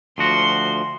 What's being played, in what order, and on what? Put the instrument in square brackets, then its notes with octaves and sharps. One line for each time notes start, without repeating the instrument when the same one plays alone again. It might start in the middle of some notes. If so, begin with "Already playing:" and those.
[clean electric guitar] D2 F3 F#4 [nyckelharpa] C6